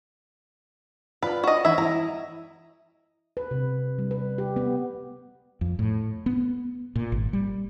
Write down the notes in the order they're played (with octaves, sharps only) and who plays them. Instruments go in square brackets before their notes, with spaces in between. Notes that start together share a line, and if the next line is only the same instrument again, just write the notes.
[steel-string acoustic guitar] F4 D5 [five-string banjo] B4
[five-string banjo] F#4 D#5
[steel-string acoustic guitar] E3 [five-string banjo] E4 E5
[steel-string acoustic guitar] E4 D#5 [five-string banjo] A#5
[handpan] B4
C3
G3
B4
G4
B3
[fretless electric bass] F2
A2
B3
A#2
G#1
G3